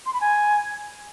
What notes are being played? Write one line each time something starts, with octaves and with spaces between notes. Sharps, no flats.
C6
B5
G#5